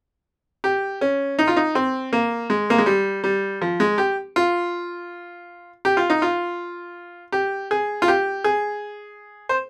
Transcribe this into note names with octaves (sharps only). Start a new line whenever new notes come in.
G4
C#4
D#4
F4
D#4
C4
A#3
G#3
A#3
G#3
G3
G3
F3
G#3
G4
F4
G4
F4
D#4
F4
G4
G#4
F4
G4
G#4
C5